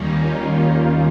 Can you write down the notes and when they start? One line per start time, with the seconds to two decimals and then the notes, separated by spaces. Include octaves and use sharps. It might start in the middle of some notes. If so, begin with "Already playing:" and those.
Already playing: D#2 D#3 G3 A#3 C#4 D#4
0.13 F4